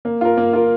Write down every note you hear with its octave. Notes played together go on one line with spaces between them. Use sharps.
A#3
F4 A#4
A#3
F4 A#4